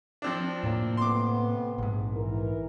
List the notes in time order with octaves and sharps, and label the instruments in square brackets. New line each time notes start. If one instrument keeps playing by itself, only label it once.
[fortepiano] F3 C4 D4
[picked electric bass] A2 C3 A#3
[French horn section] A3 B3 C4 [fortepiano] C6 D6
[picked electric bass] A#1 G#2
[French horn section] E3 A#4